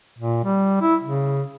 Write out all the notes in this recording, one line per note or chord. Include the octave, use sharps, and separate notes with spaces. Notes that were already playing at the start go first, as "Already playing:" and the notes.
A#2
G3
E4
C#3